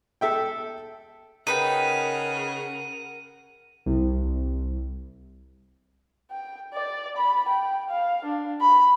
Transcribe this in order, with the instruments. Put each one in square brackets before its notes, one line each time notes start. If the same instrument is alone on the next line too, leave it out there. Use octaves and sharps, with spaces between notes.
[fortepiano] A4 E5 G5
[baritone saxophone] C#3 [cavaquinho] D#4 B4 G5 [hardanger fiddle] A#4 F#5 [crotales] D#7
[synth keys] C2
[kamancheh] G5
D5
B5
G5
F5
D4
B5